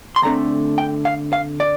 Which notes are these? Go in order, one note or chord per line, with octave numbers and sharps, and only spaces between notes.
C6
D2 D3 A3 C4 A#5
G5
F5
F5
D5